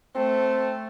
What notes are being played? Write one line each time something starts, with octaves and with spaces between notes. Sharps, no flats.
A3 C4